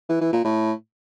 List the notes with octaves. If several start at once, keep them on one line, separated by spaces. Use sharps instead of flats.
E3
E3
A#2
A2